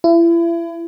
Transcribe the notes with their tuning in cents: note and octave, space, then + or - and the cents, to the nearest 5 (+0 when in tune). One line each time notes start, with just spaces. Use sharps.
E4 +35